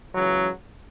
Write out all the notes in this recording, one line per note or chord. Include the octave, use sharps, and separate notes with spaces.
C#2 C#3 E3 F#3